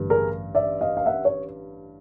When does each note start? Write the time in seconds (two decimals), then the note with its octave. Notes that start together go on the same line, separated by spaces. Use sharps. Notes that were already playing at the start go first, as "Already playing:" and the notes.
Already playing: A1 G2 D3
0.10 G#4 A#4
0.55 D5 E5
0.81 D#5 F5
0.97 F5
1.06 E5 F#5
1.25 C#5